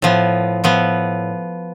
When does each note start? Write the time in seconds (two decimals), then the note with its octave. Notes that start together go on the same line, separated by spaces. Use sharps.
0.02 A2 F3 B3
0.64 A2 F3 B3